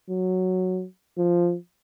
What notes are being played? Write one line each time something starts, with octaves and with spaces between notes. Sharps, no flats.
F#3
F3